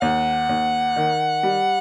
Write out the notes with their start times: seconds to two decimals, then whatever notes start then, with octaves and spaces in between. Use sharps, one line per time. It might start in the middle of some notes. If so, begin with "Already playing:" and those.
0.02 D#2 F#5
0.49 D#2
0.96 D#3
1.43 G3